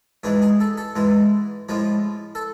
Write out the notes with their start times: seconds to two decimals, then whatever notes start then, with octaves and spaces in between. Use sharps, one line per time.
0.23 G#2 E3 G#3 D4
0.42 G#4
0.60 A4
0.77 A4
0.96 G#2 E3 G#3
1.69 A2 F3 G#3
2.35 A4